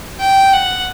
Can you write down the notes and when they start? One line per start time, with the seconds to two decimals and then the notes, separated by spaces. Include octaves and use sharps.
0.20 G5
0.53 F#5